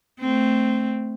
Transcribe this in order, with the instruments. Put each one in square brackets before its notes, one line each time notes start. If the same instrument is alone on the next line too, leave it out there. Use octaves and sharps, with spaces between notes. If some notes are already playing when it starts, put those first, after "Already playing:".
[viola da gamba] A3 C4